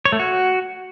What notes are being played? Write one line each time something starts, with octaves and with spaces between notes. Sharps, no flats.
C#5
A3
F#4